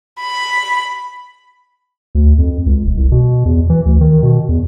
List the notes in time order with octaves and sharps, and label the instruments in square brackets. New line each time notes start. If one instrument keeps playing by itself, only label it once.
[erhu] B5
[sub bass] D2
F2
C#2
D#1
C2
B2
E2
E3
D2
D#3
B2
E2